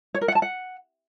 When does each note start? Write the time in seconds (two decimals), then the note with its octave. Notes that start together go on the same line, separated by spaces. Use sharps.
0.15 C#5
0.21 A#4
0.28 F#5
0.35 A5
0.42 F#5